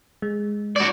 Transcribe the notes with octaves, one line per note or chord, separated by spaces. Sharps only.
G#3
F#4 D5